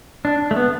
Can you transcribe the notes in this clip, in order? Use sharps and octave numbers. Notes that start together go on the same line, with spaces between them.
D4
A3
B3